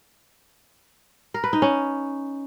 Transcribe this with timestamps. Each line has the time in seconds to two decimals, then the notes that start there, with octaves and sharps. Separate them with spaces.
1.34 A#4
1.44 B4
1.53 D#4
1.62 C#4